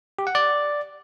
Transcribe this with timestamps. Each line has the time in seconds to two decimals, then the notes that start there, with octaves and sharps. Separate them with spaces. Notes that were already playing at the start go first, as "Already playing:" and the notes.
0.19 G4
0.27 F#5
0.35 D5